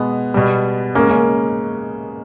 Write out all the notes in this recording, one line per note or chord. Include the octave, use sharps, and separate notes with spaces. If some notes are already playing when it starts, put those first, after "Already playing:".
Already playing: B2 G#3 B3
B2 G3
C#3 G#3 A#3 C#4
A#3 C#4